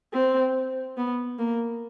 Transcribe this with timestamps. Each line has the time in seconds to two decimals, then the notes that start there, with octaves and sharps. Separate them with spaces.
0.13 C4
0.97 B3
1.38 A#3